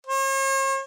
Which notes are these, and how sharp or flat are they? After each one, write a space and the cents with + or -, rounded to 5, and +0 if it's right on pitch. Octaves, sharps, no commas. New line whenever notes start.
C#5 -45